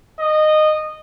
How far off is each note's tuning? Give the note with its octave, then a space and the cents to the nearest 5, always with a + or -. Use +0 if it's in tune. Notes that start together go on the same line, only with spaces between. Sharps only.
D#5 -15